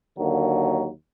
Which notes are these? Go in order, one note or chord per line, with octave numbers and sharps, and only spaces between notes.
D#2 D3 F#3 A#3